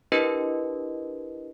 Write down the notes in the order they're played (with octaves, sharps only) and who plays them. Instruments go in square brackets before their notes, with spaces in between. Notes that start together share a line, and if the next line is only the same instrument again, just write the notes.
[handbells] D4 E4 G4 A#4 B4 D#5